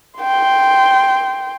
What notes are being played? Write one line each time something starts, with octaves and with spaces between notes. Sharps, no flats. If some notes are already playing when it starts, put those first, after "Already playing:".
G5 C6